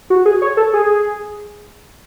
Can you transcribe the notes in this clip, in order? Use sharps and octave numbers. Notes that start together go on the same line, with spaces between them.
F#4
G#4
C#5
A4
G#4